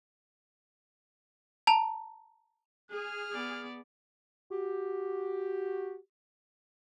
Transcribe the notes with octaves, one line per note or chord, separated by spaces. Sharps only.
A5 A#5 F7
G#4 F6
B3 D5
F#4 G4